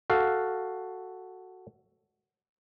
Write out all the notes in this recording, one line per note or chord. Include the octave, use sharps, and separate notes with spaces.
F#4 A4 F5